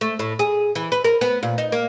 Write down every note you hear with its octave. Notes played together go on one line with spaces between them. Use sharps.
A3
A2
G#4
E3
B4
A#4
B3
A#2
D#4
A#3